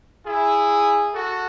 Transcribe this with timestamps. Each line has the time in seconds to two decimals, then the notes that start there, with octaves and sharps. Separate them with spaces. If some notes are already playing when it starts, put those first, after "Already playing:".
0.25 E4 G#4
1.14 F#4 A4